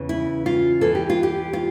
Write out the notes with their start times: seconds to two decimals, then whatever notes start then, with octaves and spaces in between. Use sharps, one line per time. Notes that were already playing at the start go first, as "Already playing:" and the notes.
Already playing: E2 C#3 E3
0.09 E4
0.46 F4
0.81 E2 E3 A4
0.95 G4
1.10 F4
1.23 G4
1.53 F4